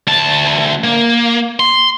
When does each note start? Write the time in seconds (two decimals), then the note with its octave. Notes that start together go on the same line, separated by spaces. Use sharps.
0.07 D2 A5
0.84 A#3
1.60 C6